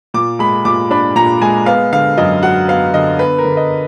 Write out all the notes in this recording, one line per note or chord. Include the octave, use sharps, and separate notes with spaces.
A#2 D6
G#3 B5
A#2 D6
D4 B5
A#2 A#5
G#3 G#5
B3 F5
D3 F5
F#2 D#5
F#3 F#5
B3 F5
D3 D#5
B3 B4
A#4
D3
D#5